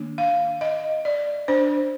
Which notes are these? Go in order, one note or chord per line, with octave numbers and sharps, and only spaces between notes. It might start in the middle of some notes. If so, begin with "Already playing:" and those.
Already playing: D#3 A#3 D4
F5
D#5
D5
D4 C5